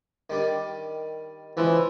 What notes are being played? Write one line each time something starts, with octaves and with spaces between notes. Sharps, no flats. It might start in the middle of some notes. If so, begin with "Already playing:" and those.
D#3 G3 D4
C#2 E3 F3